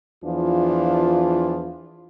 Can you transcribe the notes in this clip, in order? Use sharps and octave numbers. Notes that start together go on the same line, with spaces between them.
E2 E3 F3 D4 F4